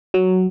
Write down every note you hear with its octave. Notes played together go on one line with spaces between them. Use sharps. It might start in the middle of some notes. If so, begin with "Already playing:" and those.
F#3